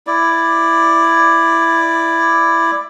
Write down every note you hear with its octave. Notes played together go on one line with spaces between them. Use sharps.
E4 D5